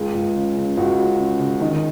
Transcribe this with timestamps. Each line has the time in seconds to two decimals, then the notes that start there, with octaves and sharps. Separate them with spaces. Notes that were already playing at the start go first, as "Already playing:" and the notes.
Already playing: C#2 G#4
0.14 C#2
0.35 C#3
0.56 C#3
0.77 C#2 F#4
0.99 C#3
1.19 C#3
1.40 C#3
1.61 D#3 D#4